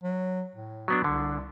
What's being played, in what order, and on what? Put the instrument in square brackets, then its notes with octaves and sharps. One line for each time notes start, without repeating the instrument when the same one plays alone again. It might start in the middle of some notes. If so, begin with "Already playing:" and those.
[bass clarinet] F#3
A2
[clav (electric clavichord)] F#3 B3 D4
[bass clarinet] C2 [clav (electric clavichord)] D3